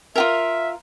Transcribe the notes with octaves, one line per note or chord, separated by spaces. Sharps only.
F4 G4 A#4 E5